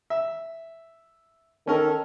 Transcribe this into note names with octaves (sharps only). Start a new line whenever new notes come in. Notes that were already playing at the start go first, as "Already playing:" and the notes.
E5
D#3 C#4 A4 A#4